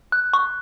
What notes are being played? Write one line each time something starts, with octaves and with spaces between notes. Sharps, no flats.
F#6
C#6